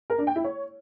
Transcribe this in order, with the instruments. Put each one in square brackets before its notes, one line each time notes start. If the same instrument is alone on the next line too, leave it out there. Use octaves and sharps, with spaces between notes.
[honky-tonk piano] A#4
D4
G5
E4
C#5